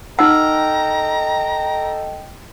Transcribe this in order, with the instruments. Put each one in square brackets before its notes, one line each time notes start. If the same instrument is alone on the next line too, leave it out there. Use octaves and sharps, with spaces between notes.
[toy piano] D#4 F#5 [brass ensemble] A4 D#5 G5 [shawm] A#5 [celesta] E6 F6